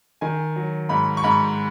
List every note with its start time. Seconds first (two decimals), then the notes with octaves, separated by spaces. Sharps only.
0.21 D#3 G#5
0.56 F#3
0.89 G#2 B5
1.17 C#6
1.24 G#2 B5